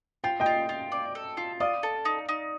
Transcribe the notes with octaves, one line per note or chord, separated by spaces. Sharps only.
F4 G5
D#5 G5
F4
F4
D5
A4
F4
D5 D#5 F5
A4
D#4
D#4